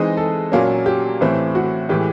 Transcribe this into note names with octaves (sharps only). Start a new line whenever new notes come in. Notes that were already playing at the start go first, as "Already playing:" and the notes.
Already playing: E3 G#3 C4 D#4 D#5
A4
A#2 F#3 A#3 C#4
G4
A2 E3 A3 C4
F#4
A2 E3 G#3 G4